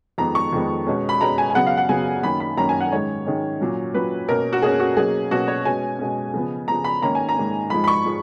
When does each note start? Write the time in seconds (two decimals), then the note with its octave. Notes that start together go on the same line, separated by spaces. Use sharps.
0.18 F2 D#3 G#3 B3 A#5
0.35 C#6
0.53 F2 D#3 G#3 B3
0.87 B2 G#3 C#4
1.09 B5
1.21 B2 G#3 C#4 A#5
1.38 G#5
1.50 G#5
1.55 C#3 F#3 B3 F#5
1.67 F5
1.78 F#5
1.89 C#3 F#3 B3 G#5
2.23 F#2 D#3 A#3 C#4 B5
2.40 B5
2.57 F#2 D#3 A#3 C#4 A#5
2.69 G#5
2.80 F#5
2.92 G#2 D#3 G#3 C#4 C#5
3.26 G#2 D#3 G#3 C#4
3.60 A#2 F#3 C#4
3.94 A#2 F#3 C#4 B4
4.29 B2 A#3 C#4 A#4
4.53 F#4
4.62 B2 A#3 C#4 G#4
4.80 F#4
4.97 B2 F#3 A#3 C#4 G#4
5.31 B2 F#3 A#3 C#4 F#4
5.48 C#5
5.65 B2 G#3 C#4 G#5
5.99 B2 G#3 C#4
6.34 C#3 F3 B3
6.68 C#3 F3 B3 A#5
6.84 B5
7.02 G#2 D#3 A#3 C#4 A#5
7.15 G#5
7.29 A#5
7.36 G#2 D#3 A#3 C#4
7.70 G#2 F3 G#3 B5
7.84 B5
7.88 C#6
8.05 F3 G#3